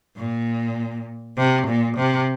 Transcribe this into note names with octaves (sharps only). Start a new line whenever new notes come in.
A#2
C3
A#2
C3